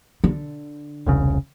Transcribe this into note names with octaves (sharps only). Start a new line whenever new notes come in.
D3
E1 C2 C#3